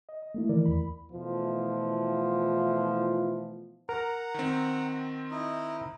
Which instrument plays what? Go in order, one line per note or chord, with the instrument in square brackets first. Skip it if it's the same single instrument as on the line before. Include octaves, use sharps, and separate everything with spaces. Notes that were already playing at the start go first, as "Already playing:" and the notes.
[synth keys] D#5
D#5
A3 A#3 E4
D#3 E3 E4 A#4 D5
E2 B5
[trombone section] B2 E3 F3 A3 E4 F4
[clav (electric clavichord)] A#4 [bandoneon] F#5 A#5
[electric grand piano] D#3 C4
[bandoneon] D#4 E4 D#5